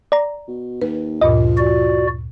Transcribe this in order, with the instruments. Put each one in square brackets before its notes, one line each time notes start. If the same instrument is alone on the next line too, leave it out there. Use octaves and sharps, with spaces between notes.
[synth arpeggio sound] D5 A#5
[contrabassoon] B2
[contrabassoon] D#2 [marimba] B4
[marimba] D2 G2 A#2 [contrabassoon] F3 [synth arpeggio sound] D#5
[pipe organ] F#4 D5